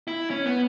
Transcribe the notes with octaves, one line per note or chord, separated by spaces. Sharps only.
E4
C#4
B3